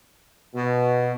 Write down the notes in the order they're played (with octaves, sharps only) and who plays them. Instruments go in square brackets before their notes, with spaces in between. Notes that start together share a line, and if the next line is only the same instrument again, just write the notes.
[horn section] B2